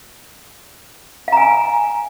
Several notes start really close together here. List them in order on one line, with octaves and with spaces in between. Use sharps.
F5 A#5 G#5